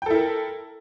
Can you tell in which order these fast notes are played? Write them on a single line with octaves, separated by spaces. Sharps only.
G5 A4 E4 A#4